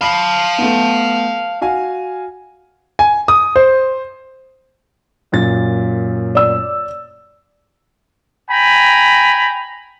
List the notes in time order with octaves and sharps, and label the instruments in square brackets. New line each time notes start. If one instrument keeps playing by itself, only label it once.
[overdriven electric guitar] F5 A5 [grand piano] B5 C7
[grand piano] A3 B3
F#4 F5 G#5
G#5
D#6
C5
F#2 A#2 A6
[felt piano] D5 E6
[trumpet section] G5 G#5 A#5 B5